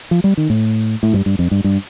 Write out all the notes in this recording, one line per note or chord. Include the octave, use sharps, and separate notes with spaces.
F3
G3
D#3
A2
A2
G2
G2
F2
G2
G2